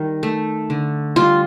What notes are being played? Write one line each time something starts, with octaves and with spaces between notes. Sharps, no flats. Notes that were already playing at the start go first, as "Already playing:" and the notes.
Already playing: D#3 G3
A3
D3
G3 F4